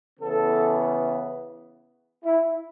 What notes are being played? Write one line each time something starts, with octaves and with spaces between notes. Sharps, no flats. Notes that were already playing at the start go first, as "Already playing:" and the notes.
C#3 E3 B3 A4
E4